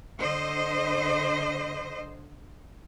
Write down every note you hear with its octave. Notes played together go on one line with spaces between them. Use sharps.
D3 C5 D#5